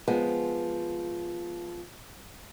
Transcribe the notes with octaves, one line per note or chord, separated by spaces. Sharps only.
F3 G#3 B3